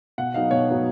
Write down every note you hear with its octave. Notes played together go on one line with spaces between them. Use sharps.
B2 F#5
F#3 B3 D#4 F5
B2 C#5
F#3 B3 D#4